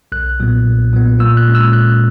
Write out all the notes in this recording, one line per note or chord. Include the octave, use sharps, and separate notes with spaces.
B1 F#6
A#2 F#3 B3
B1
A#2 F#3 B3
A#2 E6
F#6
G#3 C#4
E6
A#2 F#6